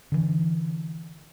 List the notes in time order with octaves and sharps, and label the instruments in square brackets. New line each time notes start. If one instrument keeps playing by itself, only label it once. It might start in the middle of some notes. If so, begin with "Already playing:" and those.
[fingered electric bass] D3 E3